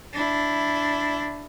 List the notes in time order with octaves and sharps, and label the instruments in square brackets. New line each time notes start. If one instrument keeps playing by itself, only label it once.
[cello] D4 E4